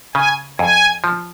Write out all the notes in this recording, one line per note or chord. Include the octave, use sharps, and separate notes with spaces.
C#3 G#5
F2 G#5
F3